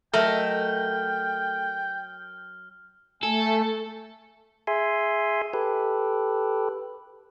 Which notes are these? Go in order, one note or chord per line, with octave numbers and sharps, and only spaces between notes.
F#3 A3 A#4 D#5 G5 F6
A3 A4 G#5
G#4 E5 G#5 C6
G4 A4 B4